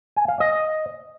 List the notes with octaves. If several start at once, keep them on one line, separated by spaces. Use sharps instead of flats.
G#5
F5
D#5